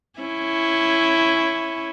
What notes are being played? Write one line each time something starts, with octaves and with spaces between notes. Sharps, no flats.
C#4 E4